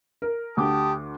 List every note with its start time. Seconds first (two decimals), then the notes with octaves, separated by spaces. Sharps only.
0.22 A#4
0.57 D2 G4 F#5 A5 D6 D#6